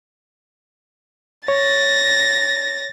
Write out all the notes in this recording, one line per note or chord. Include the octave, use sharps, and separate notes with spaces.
C#5 A6 A#6